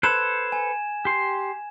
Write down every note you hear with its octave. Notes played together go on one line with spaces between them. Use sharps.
A4 B4 C5 G#6 E7
G#5
G4 C6